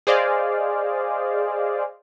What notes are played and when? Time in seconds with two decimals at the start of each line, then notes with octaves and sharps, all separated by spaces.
0.07 G#4 C5 D5 D#5 F5